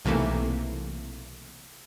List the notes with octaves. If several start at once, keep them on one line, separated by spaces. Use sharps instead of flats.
B1 C3 E3 A3 A#3